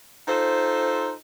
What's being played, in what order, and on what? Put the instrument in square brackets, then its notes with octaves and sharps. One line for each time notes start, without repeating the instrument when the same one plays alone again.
[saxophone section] D#4 F4 A4 C5